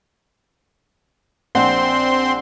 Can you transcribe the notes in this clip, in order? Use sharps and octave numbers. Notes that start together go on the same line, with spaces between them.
A#1 C4 F#5 C6